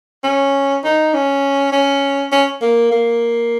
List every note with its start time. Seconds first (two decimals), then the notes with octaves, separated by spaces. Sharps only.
0.23 C#4
0.84 D#4
1.14 C#4
1.72 C#4
2.32 C#4
2.61 A#3
2.91 A#3